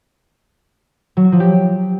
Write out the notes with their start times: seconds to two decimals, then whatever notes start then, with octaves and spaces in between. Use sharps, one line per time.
1.17 F#3
1.24 F#4
1.32 F3
1.40 G4